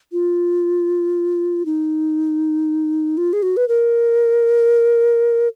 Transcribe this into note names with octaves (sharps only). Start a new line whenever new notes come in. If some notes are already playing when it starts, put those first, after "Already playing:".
F4
D#4
F4
G#4
F#4
B4
A#4